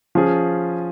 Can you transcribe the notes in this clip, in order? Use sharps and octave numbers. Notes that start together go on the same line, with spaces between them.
F3 C#4 F4 G#4